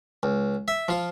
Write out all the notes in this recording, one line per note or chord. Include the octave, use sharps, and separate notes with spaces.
C#2
E5
F3 F4